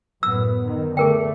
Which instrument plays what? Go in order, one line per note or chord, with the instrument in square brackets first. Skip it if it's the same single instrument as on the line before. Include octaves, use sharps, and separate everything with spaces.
[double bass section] F#2 A2 B3 [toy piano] E6
[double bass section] D#3
[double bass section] D3 A3 [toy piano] G#4 A#4 G5